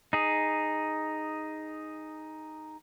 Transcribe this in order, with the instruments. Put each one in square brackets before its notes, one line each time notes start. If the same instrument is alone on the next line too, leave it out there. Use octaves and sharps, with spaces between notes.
[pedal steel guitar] D#4 G#4